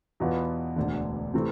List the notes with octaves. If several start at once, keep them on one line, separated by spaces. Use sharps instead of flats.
E2 B2 B3 F4
E1 D2 D3
C3 E3 A3 C4